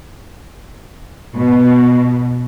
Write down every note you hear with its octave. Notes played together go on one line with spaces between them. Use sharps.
B2